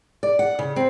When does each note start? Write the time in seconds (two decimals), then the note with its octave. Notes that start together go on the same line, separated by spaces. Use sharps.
0.23 D5
0.39 F#5
0.59 C#3
0.76 C4